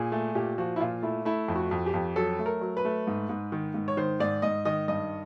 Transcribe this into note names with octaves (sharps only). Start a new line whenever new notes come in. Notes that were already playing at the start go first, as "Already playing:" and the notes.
Already playing: A#2 G#4
A3
A#2 G4
F3 F#4
E4
A#2 F4
A3 E4
A3 E4
F2
F#4
F2
G4
F2
F#3 A4
A3
A#4
F#3
B4
A3
G#2
G#2
D#3
G#2
C#5
D#3 C5
G#2 D5
G#2 D#5
D#3 D#5
G2 D#5